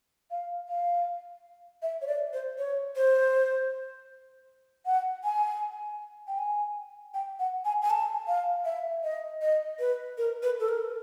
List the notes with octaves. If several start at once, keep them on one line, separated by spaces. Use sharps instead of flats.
F5
F5
E5
C#5
D5
C5
C#5
C5
F#5
G#5
G5
G#5
G5
F#5
G#5
G#5
A5
F5
E5
D#5
D#5
B4
A#4
B4
A4
A#4